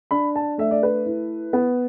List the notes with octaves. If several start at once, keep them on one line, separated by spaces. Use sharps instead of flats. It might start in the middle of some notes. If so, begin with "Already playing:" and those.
D4 B5
A5
A3 E5
D5
B4
E4
B3